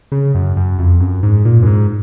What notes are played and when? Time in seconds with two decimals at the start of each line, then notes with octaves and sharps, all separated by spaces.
0.12 C#3
0.35 F#2
0.57 F#2
0.79 F2
1.00 F#2
1.23 G#2
1.45 A#2
1.63 F#2
1.67 G#2